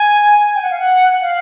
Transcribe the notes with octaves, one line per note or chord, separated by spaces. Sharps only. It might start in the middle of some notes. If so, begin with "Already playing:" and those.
Already playing: G#5
G5
F#5
F5
F#5
F5